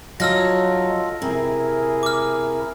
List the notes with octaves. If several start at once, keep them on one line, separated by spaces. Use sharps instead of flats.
F#3 D#4 F4 F#4 A4 E6 F6 A#6
C3 E4 G#4 A#4
D6 F6